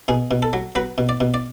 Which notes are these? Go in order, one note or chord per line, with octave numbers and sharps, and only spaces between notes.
B2 G#4
B2
A4
F#3
F#3 B4
B2
D5
B2
D5